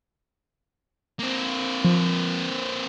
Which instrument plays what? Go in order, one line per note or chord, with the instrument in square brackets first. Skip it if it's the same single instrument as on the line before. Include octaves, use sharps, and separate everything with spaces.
[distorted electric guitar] A#3 C4
[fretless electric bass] F3